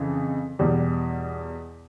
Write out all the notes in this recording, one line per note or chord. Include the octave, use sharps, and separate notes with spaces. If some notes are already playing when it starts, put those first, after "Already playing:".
Already playing: F2 C#3 E3
E2 B2 G3